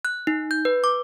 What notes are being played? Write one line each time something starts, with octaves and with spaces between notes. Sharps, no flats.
F#6
D#4
G6
B4
D6